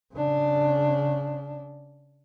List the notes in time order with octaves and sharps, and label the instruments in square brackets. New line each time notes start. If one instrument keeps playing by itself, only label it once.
[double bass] C#3 D4